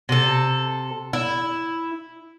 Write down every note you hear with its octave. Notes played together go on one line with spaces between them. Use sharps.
C3 A4
E4